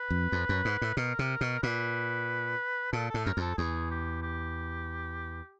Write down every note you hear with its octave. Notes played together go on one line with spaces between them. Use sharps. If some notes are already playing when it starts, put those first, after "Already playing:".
Already playing: B4
F2
F2
F#2
G#2
A2
B2 A#4
C3
B2
A#2 B4
A#2 A4
A4
A2
F#2 A#4
F2 A4
E2 G#4
G4
G4